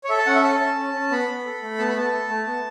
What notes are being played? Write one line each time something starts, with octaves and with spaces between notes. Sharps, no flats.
C#5
A4 E5
A5
C#4 F#5
E5
A4 A5
C#4
C#4
C#4
B3 B5
B3
A4
A3
B3 A5
B5
B3 A5
A4
A3
B3